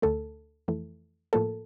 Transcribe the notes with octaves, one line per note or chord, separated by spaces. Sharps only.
D2 D3 A3 A4
F2 E3 A3
A2 F3 A#3 A4